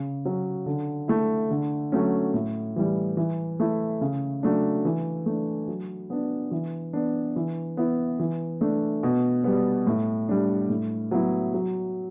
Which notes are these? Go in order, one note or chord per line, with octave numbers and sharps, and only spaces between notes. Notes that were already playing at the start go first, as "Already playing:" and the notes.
Already playing: C#3
F#3 C#4
D3
A3 E4
D3
F#3 A3 C#4
A2
E3 G3
E3
A3 E4
C#3
F#3 A3 D4
E3
A3 D4
F#3
B3 D4
E3
B3 D4
E3
B3 E4
E3
A3 D4
B2
G3 B3
A2
G3 D4
A2
F#3 B3 E4
F#3